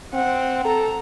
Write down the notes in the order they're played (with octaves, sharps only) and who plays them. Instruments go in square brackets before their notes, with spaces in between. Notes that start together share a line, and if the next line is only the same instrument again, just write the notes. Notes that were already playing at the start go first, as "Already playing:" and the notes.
[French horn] C4 [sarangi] F#5
[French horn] A4 [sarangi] A#5